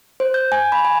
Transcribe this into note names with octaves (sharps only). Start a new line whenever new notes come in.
C5
G6
G#5
B5
G#5